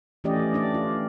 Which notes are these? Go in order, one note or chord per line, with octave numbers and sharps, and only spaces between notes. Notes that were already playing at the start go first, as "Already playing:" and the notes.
E3 A3 C#4 G4 D5 D#5
D4 D5
F4